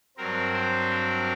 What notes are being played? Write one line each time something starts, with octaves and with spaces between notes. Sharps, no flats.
G2 F#3 C4 A#4
C5
A#4